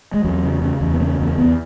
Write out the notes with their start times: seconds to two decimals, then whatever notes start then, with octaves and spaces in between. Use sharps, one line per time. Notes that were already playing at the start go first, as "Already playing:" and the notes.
0.14 G#3
0.24 E2 F#3
0.44 C#3
0.62 C#3
0.81 E2
0.94 B3
1.00 C#3 A#3
1.20 E2
1.26 A#3
1.38 E2 B3